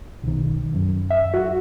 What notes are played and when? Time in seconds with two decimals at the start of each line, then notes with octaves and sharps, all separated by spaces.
0.23 B1 D#3
0.75 F#2
1.10 E5
1.34 F#4